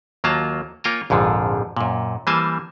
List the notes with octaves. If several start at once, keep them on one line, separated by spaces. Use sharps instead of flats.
D#2 F#3 A#3 F4 A5 A#5
A#3 F4 C#5 G5 G#5 A#5
A#1 F2 G#2 D3 F3
F#2 A#2
E3 G3 A#3 C5 G#5 A5